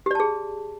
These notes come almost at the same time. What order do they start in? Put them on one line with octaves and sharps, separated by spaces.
G4 D5 A5 G#4